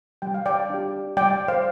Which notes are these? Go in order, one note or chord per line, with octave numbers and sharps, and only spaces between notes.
G3 G5
F5
D5 G5
D4 G4
G3 D5 G5
C5 F5